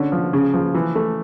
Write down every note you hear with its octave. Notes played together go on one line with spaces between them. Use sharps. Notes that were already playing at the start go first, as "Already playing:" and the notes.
Already playing: D3 C#4
F3
C#3
F3
E3
A3